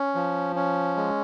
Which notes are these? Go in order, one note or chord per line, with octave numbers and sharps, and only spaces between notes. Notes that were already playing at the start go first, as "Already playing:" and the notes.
Already playing: C#4
F3
C#4
G#3